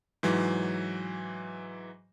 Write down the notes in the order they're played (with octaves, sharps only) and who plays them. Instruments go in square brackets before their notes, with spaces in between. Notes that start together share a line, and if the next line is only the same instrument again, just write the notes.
[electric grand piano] G#2 E3 F#3